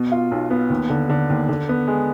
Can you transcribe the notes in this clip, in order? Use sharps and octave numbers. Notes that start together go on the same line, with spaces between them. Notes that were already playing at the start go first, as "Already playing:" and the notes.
Already playing: B2
F4
B1
B3
D#2
D3
D3
D#2
D3
B3
G#3